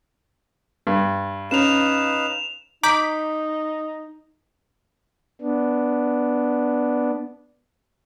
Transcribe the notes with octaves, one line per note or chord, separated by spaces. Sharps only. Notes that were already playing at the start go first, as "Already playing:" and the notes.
G2
C#4 D#4 B4 F5 E7 F7
D#4 A#5 D6 G6 B6 D7
B3 D4